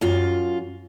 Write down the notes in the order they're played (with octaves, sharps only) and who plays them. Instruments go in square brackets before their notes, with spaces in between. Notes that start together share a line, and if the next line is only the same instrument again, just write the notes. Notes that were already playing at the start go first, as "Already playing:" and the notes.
[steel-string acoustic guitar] F#2 F4